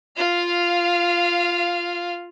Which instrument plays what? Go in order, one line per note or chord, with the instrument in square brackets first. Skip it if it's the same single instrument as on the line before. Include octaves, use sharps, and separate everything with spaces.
[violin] F4 F5